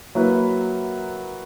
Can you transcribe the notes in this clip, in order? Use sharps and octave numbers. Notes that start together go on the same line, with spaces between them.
F#3 A#3 E4 B4